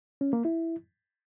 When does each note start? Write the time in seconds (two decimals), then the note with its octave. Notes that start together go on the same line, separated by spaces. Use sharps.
0.21 C#4
0.33 A#3
0.45 E4